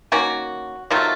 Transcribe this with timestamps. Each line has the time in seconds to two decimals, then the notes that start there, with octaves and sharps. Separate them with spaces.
0.12 D#3 A#3 C#4 F#4
0.90 C3 D#3 F#3 A3 F4